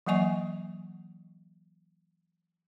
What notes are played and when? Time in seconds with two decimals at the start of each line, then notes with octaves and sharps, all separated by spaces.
0.06 E3 F#3 A#3 D#5 G#5 C#6